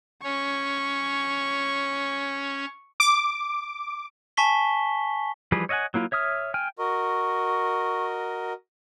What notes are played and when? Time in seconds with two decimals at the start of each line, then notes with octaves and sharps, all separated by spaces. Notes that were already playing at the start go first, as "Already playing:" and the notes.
0.24 C#4 C#5 C#6
3.00 D6
4.37 G#5 A5 C#6 B6 G7
5.52 E3 F3 G3 G#4 B4
5.69 C#5 D#5 E5 F#5 G#5
5.94 F#3 A#3 E4 F4
6.12 C#5 E5 D#6 F6
6.54 G5 G#5 F6
6.79 F#4 A#4 D#5 C#6